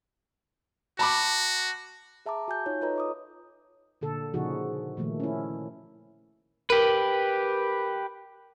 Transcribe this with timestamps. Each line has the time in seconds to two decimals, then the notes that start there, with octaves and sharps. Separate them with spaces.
0.99 F#4 A5 B5 D6
2.26 G#4 E5 A5 A#5 D6
2.48 F#4 G#5 G6
2.66 D#4 F4 C#5
2.81 F4 A4 B4 C#5 D#5 A#5
2.96 D#5 D6 D#6
4.01 A#2 D3 A4
4.34 A#2 C#3 F3 D#4 F#4 G#4
4.97 A#2 D#3 F3 A3
5.20 C#4 E4
6.70 G4 A#4 B4